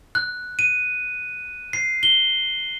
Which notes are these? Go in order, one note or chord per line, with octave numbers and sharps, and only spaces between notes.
F#6
D#7
C7
G7